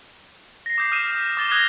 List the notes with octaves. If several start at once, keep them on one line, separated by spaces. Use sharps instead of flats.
A#6 C7
D6 D#6 G6 B6 C7
D#6 F6 A#6 C7 D#7 E7
D#6
D6 A6 G7
D#6 F#6 G#6 A#6 F7 G7